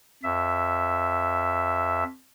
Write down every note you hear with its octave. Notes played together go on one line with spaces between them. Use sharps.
F2 E5